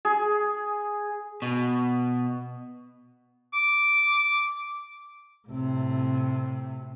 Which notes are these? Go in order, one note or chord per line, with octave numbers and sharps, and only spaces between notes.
G#4
B2
D6
A2 C3